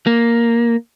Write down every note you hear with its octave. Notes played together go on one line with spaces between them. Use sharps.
A#3